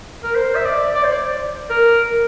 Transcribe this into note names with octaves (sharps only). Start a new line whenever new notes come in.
A#4
C5
E5
D5
D5
C5
D5
A#4